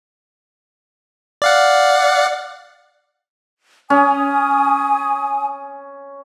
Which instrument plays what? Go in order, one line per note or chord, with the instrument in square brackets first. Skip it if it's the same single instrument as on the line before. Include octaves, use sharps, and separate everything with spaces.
[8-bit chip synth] D5 F5 F#5
[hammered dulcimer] C#4 [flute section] G#5 D#6